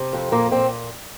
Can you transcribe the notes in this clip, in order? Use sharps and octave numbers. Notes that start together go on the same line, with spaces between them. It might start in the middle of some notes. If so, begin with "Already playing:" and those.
Already playing: C3
F2
A#2 A#3
A#2 C4